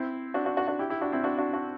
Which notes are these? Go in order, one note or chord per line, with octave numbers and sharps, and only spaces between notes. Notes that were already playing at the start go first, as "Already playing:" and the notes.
Already playing: C4 E4
D4 F#4
D4 F#4
D4 F#4
D4 F#4
E4 G4
E4 G4
D4 F#4
C4 E4
D4 F#4
D4 F#4
D4 F#4